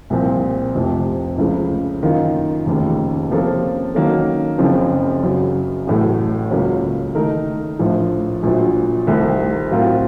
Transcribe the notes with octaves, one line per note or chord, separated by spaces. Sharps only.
C2 A#2 F3 C4
F1 F2 C3
C#2 C#3 F3 A3
F#2 D#3 A#3 F4
F1 D#2 C#3
C3 F3 A#3 C#4 A4
D#3 F#3 A#3 C#4 A4
F#1 F#2 C#3 F3 C4
F#2 C#3 F#3
A1 A2 F#3 A3
C#2 C#3 F#3 A#3 C#4
D#3 A3 D#4 A#4
A#1 A2 F3
A#1 A#2 F#3
C2 C3 D#3 A3 C4
A2 F#3 C4 F4 A#4